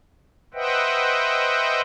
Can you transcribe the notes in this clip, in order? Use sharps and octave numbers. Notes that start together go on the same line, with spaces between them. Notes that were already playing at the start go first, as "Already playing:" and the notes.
B4 C5 D#5 E5 F#5 G5